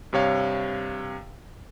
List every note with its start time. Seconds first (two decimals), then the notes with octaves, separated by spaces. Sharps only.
0.13 G2 C3 C#5 F5